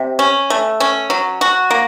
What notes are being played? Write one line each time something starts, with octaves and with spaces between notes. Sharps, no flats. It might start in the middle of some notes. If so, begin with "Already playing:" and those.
Already playing: C3
C#4
A3
C#4
F#3
F#4
A#3